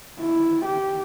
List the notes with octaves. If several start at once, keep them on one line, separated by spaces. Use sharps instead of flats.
E4
G4